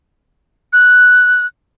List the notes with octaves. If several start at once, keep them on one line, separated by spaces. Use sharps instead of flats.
F#6